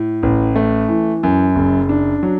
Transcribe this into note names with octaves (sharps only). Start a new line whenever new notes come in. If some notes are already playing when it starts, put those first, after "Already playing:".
Already playing: A2
A1
A3
E3
F#2
F#1
D4
F#3